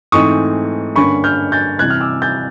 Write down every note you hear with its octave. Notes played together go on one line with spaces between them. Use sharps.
G#2 E3 A3 C4 D#4 C#6 D#6
G2 D3 G3 A#3 C#4 B5 C#6
F6 G6
G6 A6
C3 E3 G3 C4 F#6 G#6
F6
D6 E6
G6 A6